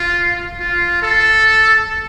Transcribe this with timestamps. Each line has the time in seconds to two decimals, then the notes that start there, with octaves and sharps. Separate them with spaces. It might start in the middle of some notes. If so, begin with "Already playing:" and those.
Already playing: F4
0.60 F4
1.02 A4